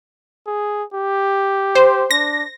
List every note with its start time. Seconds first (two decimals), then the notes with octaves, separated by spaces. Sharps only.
0.47 G#4
0.94 G4
1.75 C5
2.11 D4 A#6